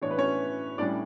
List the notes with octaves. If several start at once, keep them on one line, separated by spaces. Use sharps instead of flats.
A2 E3 B3 D4 C#5
B4
C#4 C#5
A2 G3 C#4 D4 D5